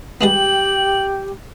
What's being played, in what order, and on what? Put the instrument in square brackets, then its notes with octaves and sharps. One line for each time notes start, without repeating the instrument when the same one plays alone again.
[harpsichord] G3 G#3 B3 [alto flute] G4 [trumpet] G5 [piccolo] F#7